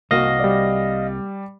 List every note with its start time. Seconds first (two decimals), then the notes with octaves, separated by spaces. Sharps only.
0.11 C2 A#3 F#4 D#5 F5 A#6
0.40 G3 D5